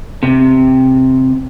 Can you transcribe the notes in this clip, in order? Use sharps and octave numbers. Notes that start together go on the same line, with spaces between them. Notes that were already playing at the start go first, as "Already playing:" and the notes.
C3